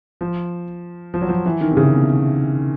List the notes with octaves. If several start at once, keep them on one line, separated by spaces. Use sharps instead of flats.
F3
F3
F#3
F3
E3
D#3
C3
C#3
B2